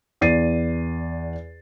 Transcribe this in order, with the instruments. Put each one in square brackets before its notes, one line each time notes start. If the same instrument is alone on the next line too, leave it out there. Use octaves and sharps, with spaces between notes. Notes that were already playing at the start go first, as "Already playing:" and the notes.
[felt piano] E2 D5 A6 C7 D#7